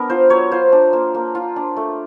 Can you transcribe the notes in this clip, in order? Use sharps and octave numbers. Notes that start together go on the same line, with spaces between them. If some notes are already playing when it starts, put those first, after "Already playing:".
Already playing: B3 D4 A#4
F4 C5
F#3 C#5
F4 C5
D4
A#3
A#3
F4
D4
A3